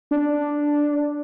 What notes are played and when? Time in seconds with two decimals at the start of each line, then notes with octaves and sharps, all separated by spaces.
0.11 D4